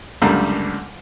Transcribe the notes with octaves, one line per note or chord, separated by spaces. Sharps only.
C#2 F#2 D3 G3 A3 A#3